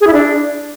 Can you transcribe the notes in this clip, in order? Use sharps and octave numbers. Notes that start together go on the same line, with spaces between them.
G#4
E4
D4